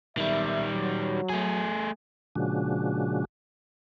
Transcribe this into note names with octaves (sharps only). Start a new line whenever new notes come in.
B1 D#3 G3 E5
F#3
A3 G#4
A#2 C#3 F3 G#3 D4 F#4